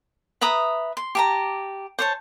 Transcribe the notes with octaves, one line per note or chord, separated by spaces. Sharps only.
B4 E5 A#5 D#6
C6
G4 A5 A#5
C5 C#5 A5